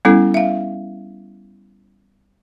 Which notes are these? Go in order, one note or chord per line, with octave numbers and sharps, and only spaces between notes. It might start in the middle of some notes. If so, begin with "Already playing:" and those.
G3 B3 C#4 E4 A4
E5 F5